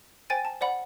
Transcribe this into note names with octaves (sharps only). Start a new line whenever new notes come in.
C5 G5 G#5 A6 D#7
A5
C5 D5 F#5 B5